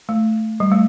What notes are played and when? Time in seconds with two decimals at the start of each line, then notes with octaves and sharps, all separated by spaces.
0.09 A3
0.60 G3
0.72 A3